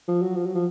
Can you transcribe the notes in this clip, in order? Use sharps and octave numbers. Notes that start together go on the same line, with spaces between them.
F3
F#3
F3
F#3
F3